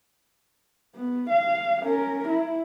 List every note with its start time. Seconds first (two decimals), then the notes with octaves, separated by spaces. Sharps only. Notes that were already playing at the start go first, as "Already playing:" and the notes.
0.95 B3
1.30 F5
1.83 C#4 A#4
2.28 E4